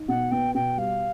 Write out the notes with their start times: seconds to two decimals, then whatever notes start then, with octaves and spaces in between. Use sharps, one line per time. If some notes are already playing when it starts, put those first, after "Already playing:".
Already playing: D#4
0.08 B2 F#5
0.31 B3 G5
0.55 B2 G5
0.77 G3 F5